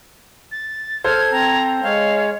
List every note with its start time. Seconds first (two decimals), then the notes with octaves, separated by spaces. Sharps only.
0.52 A6
1.04 A4 C5 F6 G#6
1.31 C4 A#5
1.83 G#3 C#5 F5